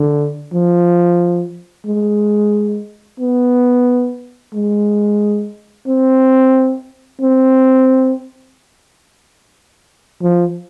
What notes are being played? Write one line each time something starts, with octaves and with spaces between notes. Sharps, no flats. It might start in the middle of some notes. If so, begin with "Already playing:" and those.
Already playing: D3
F3
G#3
B3
G#3
C4
C4
F3